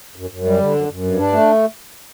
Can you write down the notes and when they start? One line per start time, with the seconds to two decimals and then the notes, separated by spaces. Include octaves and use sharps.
0.16 F#2
0.30 F#2
0.44 G3
0.60 D3
0.74 F#2
0.89 F#2
1.03 G2
1.18 D4
1.32 A3